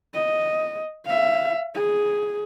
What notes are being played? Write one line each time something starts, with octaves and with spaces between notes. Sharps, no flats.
D#5
E5 F5
G#4